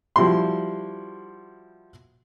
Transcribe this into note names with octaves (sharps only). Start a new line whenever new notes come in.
F3 G3 E4 F#4 C6